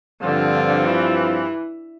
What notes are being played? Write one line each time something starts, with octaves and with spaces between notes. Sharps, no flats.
G2 D3 F3 C4 F4
E3